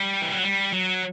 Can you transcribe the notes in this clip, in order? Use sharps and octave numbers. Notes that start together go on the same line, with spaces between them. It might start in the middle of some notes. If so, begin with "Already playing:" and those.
Already playing: G3
E3
F#3
G3
F#3